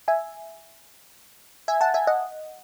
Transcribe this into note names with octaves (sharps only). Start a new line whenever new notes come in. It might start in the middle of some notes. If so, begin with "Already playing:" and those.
E5 G#5
E5 G#5
F#5 A5
E5 G#5
D#5 F#5